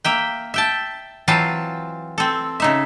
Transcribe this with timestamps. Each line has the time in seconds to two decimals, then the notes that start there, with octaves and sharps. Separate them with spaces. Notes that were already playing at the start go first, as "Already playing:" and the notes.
0.04 A#3 E5 G5
0.54 E5 G5 A5
1.28 E3 F#3 C4 F4 A5
2.18 C4 A4
2.60 C#3 D#4 E5